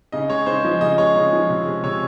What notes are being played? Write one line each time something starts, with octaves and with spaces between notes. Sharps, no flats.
C#3 D#5
G#3 C#5
C#3 C5
F3 D#5
C#3 D#5
G#3 C#5
C#3
F3
C3
G#3
C3 C#5